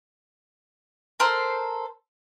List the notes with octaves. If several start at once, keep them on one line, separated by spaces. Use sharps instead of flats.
A4 A#4 C5 C6